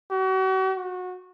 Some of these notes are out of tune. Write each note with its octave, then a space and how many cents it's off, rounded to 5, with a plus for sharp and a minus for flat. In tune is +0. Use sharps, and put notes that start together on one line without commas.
F#4 +40
F#4 -25